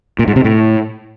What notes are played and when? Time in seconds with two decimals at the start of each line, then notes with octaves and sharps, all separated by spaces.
0.19 A#2
0.28 G#2
0.36 C3
0.44 A2